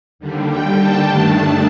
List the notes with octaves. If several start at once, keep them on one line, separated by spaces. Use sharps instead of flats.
D#2 D3 G3
G5
A5
G2 D#3 A3 D4